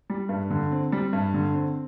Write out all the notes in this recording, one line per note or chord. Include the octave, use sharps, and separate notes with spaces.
G3
G2
D3
C4
G3
G2
D3
C4